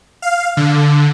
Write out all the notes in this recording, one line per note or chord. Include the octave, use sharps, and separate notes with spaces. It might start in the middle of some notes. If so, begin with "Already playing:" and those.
F5
D3